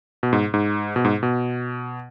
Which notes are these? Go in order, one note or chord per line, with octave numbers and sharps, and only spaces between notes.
B2
G#2
G#2
B2
G#2
B2